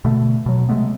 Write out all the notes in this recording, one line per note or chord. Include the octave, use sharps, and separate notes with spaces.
B2 D3 A3
B2 F#3
C3 G#3 A3 B3